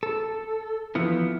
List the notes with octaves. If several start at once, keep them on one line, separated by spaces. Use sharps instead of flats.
A4
E3 F3 B3 E4